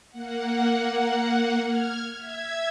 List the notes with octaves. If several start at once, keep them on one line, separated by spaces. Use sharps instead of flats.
A#3 F#5
F6 G#6
E5 G#6